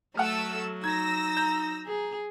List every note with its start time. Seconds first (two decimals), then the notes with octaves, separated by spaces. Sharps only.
0.17 F#3 A3 A4 F#5 E6 F6
0.84 D#4 E6 G#6 A#6
1.37 A#5 G6
1.86 G#4